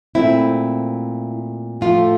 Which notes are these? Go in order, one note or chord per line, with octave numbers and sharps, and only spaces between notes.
A#2 A3 C4 E4
A2 F3 A3 F4